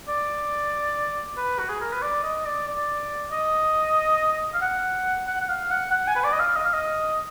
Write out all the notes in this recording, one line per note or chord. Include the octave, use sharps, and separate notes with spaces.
D5
B4
F#4
G#4
A#4
B4
D5
D#5
D5
D5
D#5
F5
F#5
F#5
F#5
F5
F#5
F#5
G#5
B4
D5
D#5
F5
D#5
F5
D#5